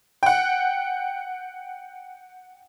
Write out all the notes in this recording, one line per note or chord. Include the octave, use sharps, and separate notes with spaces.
F#5 G5